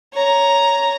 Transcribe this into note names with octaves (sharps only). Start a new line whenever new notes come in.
C#5 A#5